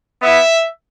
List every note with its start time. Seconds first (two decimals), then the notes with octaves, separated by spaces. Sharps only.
0.22 B3 E4 E5